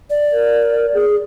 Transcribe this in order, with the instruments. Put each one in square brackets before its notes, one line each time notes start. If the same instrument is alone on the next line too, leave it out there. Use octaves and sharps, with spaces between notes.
[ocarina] D5
[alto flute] A#4
G#4